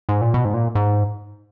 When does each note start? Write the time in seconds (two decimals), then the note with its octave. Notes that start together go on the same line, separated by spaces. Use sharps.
0.09 G#2
0.21 A#2
0.34 B2
0.45 G#2
0.54 A#2
0.75 G#2